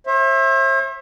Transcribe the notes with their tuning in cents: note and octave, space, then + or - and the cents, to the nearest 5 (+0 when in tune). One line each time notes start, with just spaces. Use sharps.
C5 +45 E5 +0